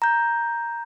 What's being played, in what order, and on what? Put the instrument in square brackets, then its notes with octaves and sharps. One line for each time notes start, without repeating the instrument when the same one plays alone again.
[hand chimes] A#5 G6